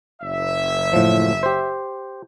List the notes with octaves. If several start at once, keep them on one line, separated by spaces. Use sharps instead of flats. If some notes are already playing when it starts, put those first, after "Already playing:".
F#1 E5
A2 F3
G4 C5